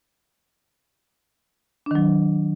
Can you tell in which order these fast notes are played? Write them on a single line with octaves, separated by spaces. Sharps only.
D4 D#3 F#3